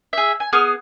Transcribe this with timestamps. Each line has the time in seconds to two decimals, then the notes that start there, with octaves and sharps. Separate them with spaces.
0.13 G#4 E5
0.40 G#5
0.53 B3 G#4 D#6 F6